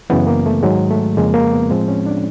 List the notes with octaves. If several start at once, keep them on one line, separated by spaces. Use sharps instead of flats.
F#2 C#3 E3 B3
A#3
A3
G#2 D#3 F#3 G#3
A3
F2 C#3 F3 G#3 A#3
A#3
B3
A2 F3 G#3 C4
C#4
D4